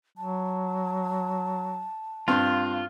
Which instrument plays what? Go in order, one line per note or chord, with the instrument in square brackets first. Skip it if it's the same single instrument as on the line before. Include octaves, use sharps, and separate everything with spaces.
[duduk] F#3 [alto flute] A5
[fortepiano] G2 C4 [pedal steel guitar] F4